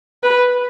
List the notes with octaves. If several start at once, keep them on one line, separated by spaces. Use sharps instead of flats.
B4